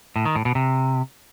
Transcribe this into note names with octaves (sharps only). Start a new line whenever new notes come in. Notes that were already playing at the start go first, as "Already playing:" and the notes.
A2
D#3
A2
B2
C3